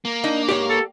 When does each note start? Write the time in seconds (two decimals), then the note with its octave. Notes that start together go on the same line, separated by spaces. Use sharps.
0.05 A#3
0.24 D4 D#4 D#5
0.49 G#2 G4 C#5 D5
0.70 A4